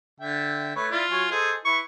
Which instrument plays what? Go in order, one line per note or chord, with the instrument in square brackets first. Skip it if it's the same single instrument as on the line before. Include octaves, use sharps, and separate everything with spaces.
[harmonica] D3 E5 G5
A3 B4 C#5
[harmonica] E4 D5 [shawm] F4
[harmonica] F#3 G#5 C#6
[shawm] G#4 [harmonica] A4 C5 D#5
[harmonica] E4 B4 [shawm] C#6